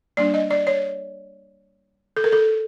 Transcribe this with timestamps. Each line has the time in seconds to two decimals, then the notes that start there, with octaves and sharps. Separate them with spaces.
0.17 G3 A#3 D4 D5
0.34 D#5
0.50 D5
0.67 C#5
2.17 A4
2.24 A#4
2.32 A4